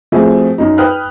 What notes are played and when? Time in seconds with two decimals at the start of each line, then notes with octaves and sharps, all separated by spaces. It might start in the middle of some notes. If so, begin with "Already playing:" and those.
0.12 F3 A3 C4 F#4 G#4
0.58 F#2 D#4
0.78 B4 G5 D#6 F6 F#6